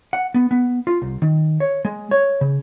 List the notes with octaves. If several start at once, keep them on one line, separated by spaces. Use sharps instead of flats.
F#5
B3
B3
F4
C2
D#3
C#5
G#3
C#5
C#3